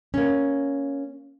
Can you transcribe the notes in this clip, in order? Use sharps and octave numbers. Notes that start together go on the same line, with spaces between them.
A#3 C#4